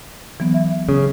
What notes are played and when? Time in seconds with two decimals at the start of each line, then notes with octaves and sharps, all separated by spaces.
0.40 E3 F#3 B3
0.54 E5
0.89 C#3